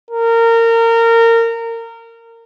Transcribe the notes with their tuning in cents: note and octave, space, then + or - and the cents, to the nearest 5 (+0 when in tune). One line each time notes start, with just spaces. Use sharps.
A#4 -25